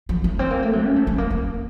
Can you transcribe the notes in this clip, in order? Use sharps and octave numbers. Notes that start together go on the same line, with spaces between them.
F3
A3
C4
A#3
A3
F#3
C#4
A3
A3
A#3
A#3